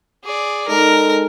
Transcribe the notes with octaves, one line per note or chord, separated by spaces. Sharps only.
G#4 D5
G#3 D#4 A4 A#4